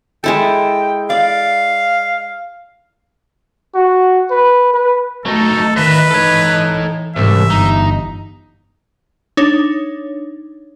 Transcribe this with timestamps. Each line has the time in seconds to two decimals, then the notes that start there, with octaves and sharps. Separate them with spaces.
0.24 G#3 E4 A4 G5
1.10 D5 F5
3.75 F#4
4.31 B4
4.73 B4
5.26 F#3 A3 D#4 A4
5.76 D#3 B4 D#5 E5
6.10 E3 D#4 A4 C#5
7.16 C2 G#2 E3 E5
7.50 G1 D#4
9.37 D4 D#4 C#5